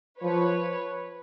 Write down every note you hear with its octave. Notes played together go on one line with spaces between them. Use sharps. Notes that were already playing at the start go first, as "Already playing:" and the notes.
F3 B4 C#5